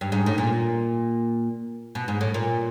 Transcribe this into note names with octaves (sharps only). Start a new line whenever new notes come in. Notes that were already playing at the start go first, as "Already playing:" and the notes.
G2
G#2
A2
A#2
B2
G#2
A2
A#2